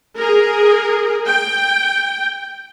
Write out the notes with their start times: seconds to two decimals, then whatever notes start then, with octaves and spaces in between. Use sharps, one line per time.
0.17 G#4 A#4
1.26 G5